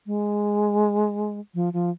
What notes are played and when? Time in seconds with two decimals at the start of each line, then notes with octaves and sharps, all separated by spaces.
0.06 G#3
1.55 F3
1.73 F3